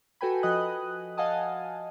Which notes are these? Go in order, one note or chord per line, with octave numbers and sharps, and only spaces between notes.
F#4 A4 B4 G5 G#5 B5
F3 F#4 D#5 D#6 F#6
D#5 F5 F#5 G#5 A5 D#6